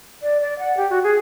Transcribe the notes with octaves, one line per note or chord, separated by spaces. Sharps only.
D5
D5
F#5
G4
F#4
G#4